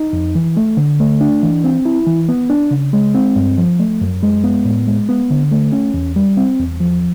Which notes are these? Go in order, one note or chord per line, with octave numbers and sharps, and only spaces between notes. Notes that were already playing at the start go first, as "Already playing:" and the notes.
Already playing: D#4
F2
E3
A3
D3
A3
D4
E3
C4
E4
E3
B3
D4
C#3
G#3
C4
G2
F3
A3
F#2
G#3
B3
A2
G#3
B3
D3
A3
C#4
E2
G3
C4
E2
F3